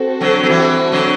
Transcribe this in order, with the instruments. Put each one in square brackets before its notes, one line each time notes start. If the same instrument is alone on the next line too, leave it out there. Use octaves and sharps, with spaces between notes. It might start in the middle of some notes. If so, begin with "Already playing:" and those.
Already playing: [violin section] C4 F#4 A4
[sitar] D3 F#3
F#3
E3 G3
D3 F#3